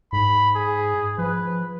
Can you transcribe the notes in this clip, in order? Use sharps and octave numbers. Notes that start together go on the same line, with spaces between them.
G#2 B5
G#4
F3 B4